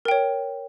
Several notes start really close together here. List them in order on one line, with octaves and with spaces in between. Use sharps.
A#4 G5 C#5